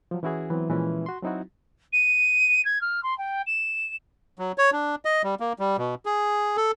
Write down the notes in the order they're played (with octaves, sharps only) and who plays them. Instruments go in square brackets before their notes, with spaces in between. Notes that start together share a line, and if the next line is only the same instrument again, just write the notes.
[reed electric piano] F3 F#3
E3 C#4 E4 F#4 G#4
E3 F#3 B3 C4
A#2 E3 F3 G#3 C#4
F#4 C6
F#3 C4 D#4 E4 F#4
[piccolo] D#7
G#6
F6
C6
G5
E7
[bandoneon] F#3
C#5
D4
D#5
G3
A#3
G3
B2
G#4
A4